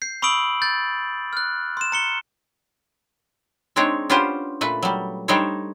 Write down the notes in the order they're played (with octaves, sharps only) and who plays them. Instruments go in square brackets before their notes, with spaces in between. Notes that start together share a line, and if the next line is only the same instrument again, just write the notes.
[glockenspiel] G6 C7
B5 C#6 D#6 E6 D7 F#7
G6 A6
F6 F#6
C6 E7
A#5 C#7 G7
[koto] G#3 C4 D4 D#4 C#5
B3 C#4 D4 F4 G4 C5
A#2 A3 B4
F#3 G3
G3 D4 D#4 A4 C5 C#5